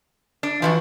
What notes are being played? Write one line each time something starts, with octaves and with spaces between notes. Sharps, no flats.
D4
E3 F3 E4 F#4